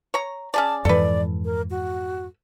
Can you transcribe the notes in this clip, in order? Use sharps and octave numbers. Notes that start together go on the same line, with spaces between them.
C#5 A#5
C#4 G#4 D5 A5
F2 G#2 E3 A4 B4 D5
A#4
F#4